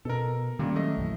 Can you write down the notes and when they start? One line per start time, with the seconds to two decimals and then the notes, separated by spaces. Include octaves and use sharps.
0.05 B2 A4 A#4
0.59 A#2 D#3 G3 A#3 C#4
0.75 F#3 A3 D#5
0.97 A#1 F#2 E3